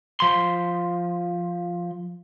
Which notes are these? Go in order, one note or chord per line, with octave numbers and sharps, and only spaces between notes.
F3 C6